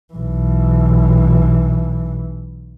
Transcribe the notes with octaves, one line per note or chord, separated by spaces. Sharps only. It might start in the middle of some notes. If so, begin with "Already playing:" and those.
B1 E3